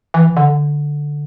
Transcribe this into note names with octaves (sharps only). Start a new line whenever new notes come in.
E3
D3